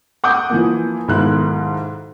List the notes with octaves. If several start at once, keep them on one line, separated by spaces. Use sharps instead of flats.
F#5 D6 D#6 G6
E3 F3 A#3
B1 G#2 D#3 E4 F#6